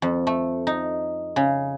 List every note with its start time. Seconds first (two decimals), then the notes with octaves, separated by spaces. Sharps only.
0.02 F2
0.27 A3
0.67 D#4
1.36 C#3